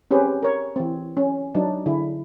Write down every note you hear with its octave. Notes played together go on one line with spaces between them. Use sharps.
C4 C#4 G4 G#4 B4 C5
A#4 C#5
E3 C4
C#4
F#3 D4 D#4
D3 E4 G#4